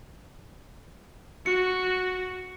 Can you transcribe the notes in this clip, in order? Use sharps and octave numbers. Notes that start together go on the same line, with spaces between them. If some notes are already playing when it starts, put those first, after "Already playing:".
F#4 C#7